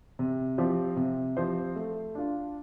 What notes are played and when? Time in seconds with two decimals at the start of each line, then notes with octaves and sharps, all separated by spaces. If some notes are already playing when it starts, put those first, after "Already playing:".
0.19 C3
0.58 F3 C4 G4 C5
0.96 C3
1.36 F3 C4 G4 C5
1.76 A3
2.15 D4 F4